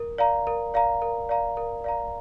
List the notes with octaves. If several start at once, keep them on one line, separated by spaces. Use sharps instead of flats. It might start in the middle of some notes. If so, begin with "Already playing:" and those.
Already playing: A#4
D5 F5 A#5
A#4
D5 F5 A#5
A#4
D5 F5 A#5
A#4
D5 F5 A#5